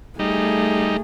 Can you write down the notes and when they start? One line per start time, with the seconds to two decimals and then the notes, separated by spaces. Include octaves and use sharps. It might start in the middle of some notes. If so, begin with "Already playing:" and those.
0.19 G3 A3 D#4 G#4